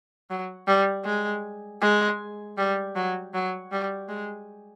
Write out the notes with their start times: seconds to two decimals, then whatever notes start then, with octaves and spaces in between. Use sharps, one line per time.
0.30 F#3
0.67 G3
1.06 G#3
1.82 G#3
2.58 G3
2.95 F#3
3.34 F#3
3.72 G3
4.09 G#3